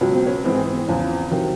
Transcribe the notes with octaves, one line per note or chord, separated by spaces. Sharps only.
C#2 B2 F#3 C#4
C4
C#4
G#2 E3 G#3 C4
C4
B3
C4
E2 C#3 F3
C3 D#3 F#3